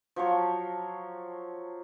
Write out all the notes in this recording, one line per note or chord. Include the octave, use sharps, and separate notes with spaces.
F3 F#3 C#5